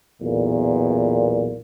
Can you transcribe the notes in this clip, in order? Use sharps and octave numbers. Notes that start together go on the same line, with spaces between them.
B1 E2 A#2